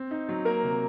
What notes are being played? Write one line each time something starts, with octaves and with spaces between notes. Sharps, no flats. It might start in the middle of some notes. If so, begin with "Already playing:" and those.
Already playing: C4
D#4
F#3
A#3 A#4
C3